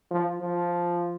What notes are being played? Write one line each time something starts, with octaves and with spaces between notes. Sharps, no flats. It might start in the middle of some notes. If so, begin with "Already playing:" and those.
F3
F3